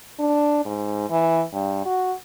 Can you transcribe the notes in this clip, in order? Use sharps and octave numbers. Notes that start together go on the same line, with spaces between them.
D4
G#2
E3
G2
F#4